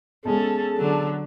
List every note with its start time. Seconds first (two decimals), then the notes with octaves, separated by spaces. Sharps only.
0.25 E2 G#3 C#4 G#4 A4 A5
0.77 D3 F#3